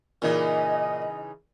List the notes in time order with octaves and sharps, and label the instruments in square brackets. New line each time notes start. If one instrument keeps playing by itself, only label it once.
[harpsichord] A#2 [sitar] C#3 E3 D#4 [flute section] D#5